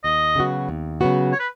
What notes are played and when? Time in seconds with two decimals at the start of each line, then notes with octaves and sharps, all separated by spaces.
0.04 D#2 D#5
0.35 C#3 F#3 B3 F#4
0.69 D#2
1.01 C#3 F#3 B3 F#4
1.32 C#5
1.39 B4